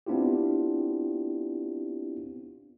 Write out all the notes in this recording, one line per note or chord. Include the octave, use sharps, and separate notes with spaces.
B3 C4 D4 E4 F4 G4